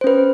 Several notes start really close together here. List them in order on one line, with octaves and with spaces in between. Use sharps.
C5 C#4 B4